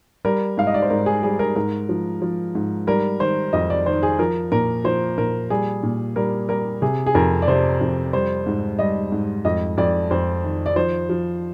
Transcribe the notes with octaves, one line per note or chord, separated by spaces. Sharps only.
G3 A#4
G#2 F5
D#5
D5
C5
G#2 A#4
G#4
G3 G#4
A#4
G#2 A#4
F3
F3
G#2
G3 A#4
D#3 C5
F2 D#5
D5
D#3 C5
G#4
F3 A#4
A#2 A#4
F3 C5
A#2 A#4
G3 G#4
A#2
G3 A#4
G3 A#4
C3 G#4
G#4
F2 A#4
D5
C3 C5
F2
G3 C5
G#2
G3 D#5
G#2
F2 D#5
F2 D5
F2 C5
D#3
D5
F3 C5
F3